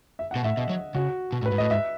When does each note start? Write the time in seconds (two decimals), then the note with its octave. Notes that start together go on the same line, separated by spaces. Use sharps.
0.19 E5
0.31 F#5
0.36 B2
0.44 A2 E5
0.57 B2 D#5
0.69 F#3
0.95 C#3 F#4
1.32 B2
1.42 A2
1.46 B4
1.52 G#2
1.58 A2 D#5
1.70 G#2 E5